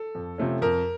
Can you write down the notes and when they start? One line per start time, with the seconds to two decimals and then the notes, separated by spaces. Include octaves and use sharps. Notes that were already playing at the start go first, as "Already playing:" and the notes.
Already playing: A4
0.15 F2
0.38 C3 F3 A3 C#4
0.62 F2 A#4